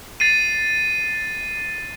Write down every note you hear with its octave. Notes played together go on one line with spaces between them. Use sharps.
A6 C7 D#7